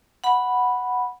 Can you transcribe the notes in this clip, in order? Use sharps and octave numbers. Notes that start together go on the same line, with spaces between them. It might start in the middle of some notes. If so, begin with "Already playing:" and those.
F#5 B5